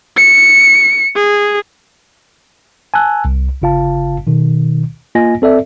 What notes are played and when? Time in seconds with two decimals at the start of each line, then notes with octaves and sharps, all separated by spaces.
0.17 C#7
1.15 G#4
2.94 G#5 A5 E6 F#6
3.25 C2
3.62 G1 C#3 F4 F5 A5
4.27 B2 D#3
5.15 A#3 F4 D#5 G#5 A#6
5.42 C4 A4 D5 E5